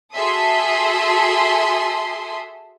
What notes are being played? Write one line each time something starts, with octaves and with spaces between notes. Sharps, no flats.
F#4 G#4 A4 E5 C6 D#6